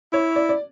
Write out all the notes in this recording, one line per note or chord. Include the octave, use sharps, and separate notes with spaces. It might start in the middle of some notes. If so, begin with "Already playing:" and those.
E4 C#5
D5
D5